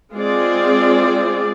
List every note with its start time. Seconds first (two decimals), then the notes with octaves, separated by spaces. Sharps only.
0.14 G#3 C4 F4 G#4 D5